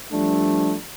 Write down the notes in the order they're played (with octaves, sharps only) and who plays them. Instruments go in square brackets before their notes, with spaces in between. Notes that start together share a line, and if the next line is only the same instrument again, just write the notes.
[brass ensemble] F3 G3 A3 D4